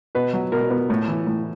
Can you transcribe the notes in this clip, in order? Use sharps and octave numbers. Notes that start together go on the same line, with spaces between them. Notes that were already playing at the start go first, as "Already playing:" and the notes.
B2 B4
F#3
B2 A#4
B3
A2
E3
A2